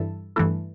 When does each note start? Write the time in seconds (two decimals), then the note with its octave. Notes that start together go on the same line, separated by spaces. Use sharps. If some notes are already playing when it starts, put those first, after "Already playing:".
Already playing: G2 E3 E4 A4
0.36 G2 E3 A3 E4 A4